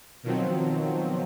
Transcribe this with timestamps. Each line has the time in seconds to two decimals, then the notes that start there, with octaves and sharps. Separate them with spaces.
0.23 B2 D#3 F3 F#3 C4